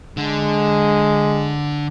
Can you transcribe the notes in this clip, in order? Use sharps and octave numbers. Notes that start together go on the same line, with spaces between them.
D3 G#3